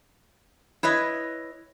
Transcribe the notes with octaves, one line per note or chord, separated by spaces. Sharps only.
E4 B4 C#5 D#5